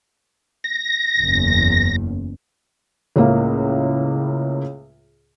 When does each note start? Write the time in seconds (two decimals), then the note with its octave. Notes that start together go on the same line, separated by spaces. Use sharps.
0.64 A#6
1.21 F#1 E2
3.16 C#2 A2 C#3 A#3